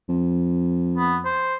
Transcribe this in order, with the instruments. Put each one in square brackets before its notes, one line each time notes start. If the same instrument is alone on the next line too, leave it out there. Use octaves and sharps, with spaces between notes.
[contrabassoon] F2
[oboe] B3
C5